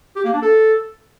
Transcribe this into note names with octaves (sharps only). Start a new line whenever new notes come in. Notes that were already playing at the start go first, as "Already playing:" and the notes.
G4
A#3
D4
A4